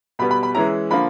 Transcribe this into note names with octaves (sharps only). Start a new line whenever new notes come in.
B2 G3 B3 B5
B5
B5
E3 G#3 C#4 E4 A#5
D3 F3 A#3 B5